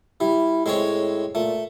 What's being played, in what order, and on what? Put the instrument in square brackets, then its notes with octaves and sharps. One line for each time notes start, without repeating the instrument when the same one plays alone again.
[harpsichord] G3 [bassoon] E4
[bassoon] A2 [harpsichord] G#3 C4 C#5
[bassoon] A#2 [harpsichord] A3